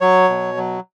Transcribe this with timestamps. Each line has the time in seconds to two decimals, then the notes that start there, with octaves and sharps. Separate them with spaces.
0.01 F#3 C#5
0.30 B2
0.57 F#3